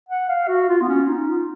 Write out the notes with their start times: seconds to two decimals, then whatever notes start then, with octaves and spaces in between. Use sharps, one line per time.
0.09 F#5
0.29 F5
0.48 F#4
0.69 F4
0.82 B3
0.89 C#4
1.09 D#4
1.28 F4